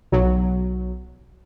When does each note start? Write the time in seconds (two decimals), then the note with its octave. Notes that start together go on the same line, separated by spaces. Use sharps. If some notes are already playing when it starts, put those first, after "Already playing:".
0.12 B1 F#3